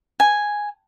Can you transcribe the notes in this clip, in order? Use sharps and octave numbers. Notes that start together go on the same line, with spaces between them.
G#5